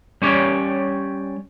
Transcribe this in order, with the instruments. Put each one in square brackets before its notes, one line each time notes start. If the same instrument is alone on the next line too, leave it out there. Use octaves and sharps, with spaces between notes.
[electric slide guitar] G3 C#4 G4 C#5 D5